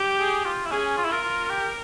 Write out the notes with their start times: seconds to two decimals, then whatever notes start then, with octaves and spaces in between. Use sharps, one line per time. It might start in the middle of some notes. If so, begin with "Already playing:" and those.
Already playing: G4
0.20 G#4
0.45 F4
0.66 E4
0.71 C#4 G#4
0.97 F4
1.05 E4
1.10 F4 A#4
1.23 F4
1.50 G4